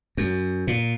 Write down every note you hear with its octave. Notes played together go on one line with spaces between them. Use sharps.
F#2
A#2